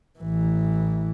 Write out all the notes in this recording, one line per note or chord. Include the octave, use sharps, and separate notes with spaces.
A1 E3